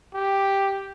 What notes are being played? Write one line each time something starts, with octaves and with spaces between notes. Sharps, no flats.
G4